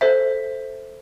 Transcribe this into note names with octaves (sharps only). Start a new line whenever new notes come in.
A4 C5 E5